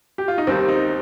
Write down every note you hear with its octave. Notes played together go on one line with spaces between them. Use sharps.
G4
F4
D#4
D#2 D#3 G3 C4
D#4